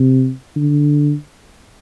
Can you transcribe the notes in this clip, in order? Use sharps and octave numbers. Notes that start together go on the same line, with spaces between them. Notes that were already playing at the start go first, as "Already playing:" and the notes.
Already playing: C3
D3